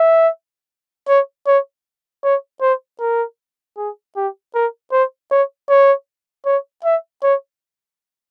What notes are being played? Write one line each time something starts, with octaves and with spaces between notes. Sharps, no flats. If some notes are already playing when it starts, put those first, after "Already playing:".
Already playing: E5
C#5
C#5
C#5
C5
A#4
G#4
G4
A#4
C5
C#5
C#5
C#5
E5
C#5